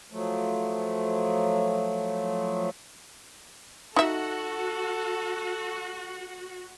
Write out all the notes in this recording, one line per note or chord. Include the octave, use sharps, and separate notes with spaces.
F3 F#3 A3
D#4 F#4 A4 E5